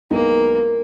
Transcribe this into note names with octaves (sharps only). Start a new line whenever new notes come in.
B1 B2 G#3 A#3 B3 D#4